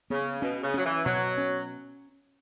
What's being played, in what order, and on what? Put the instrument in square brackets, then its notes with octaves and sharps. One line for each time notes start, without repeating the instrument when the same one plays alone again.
[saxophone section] C#3 [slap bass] B3
[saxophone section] B2 [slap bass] C#4
[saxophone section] C#3
[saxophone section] F#3 [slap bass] C#4
[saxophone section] E3
[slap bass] B2 [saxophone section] F#3
[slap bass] C#4